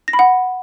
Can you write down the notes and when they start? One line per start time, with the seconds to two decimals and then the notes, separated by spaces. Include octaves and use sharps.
0.08 A#6
0.13 B5
0.19 F#5